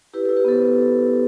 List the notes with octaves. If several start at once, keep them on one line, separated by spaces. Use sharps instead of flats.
E4 G4 B4
A4
E4
G4 B4
B3 A4 C5